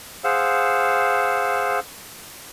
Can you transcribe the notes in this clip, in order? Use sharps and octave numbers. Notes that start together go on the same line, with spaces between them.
G#4 C5 F5 F#5 E6